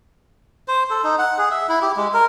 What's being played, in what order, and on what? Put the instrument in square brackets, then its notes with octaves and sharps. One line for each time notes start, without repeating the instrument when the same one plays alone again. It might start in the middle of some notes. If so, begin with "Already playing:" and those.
[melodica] C5
A4
D#4
F#5
G#4
E5
E4
G4
G#3
A#4